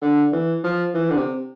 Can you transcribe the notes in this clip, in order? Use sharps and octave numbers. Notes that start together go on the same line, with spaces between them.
D3
E3
F3
E3
D3
C3